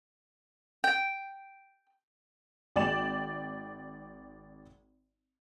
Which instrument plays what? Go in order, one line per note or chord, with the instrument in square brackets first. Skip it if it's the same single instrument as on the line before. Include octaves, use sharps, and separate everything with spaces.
[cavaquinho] G5
[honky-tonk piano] G#1 D5 G5 E7